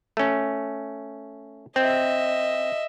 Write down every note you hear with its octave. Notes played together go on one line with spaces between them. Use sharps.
A3 C#4
C4 D#5 E5